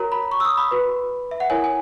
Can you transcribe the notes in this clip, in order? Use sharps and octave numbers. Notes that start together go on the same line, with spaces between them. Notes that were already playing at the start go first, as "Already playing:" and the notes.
Already playing: F#4 A#4 C#5 A#5
B5
C#6
E6
D#6
B5
F#4 B4
E5
F#5
E4 A#4 C#5 G#5
G#5